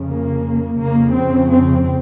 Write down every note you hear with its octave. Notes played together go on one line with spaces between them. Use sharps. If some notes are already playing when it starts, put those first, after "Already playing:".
Already playing: F2 C#3
A#3
F2 C#3 A#3
C4
C4